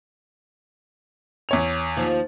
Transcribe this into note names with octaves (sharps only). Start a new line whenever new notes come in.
E2 C#5 F7
D#2 F3